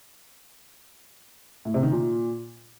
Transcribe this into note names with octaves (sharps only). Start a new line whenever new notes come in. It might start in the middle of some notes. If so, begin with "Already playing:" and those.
A2
C3
D#3
A#2